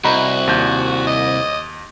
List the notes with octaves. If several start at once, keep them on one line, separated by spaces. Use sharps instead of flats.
C2 F#4 D#5 A#5 B5
D#2 G6
D#5